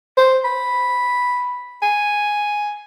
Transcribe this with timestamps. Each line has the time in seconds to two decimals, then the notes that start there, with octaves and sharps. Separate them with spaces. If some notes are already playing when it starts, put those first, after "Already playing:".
0.18 C5
0.45 B5
1.83 G#5